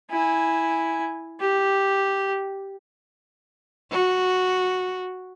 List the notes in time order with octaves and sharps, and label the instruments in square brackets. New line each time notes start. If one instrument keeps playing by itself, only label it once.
[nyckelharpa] E4 G#5
G4
[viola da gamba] F#4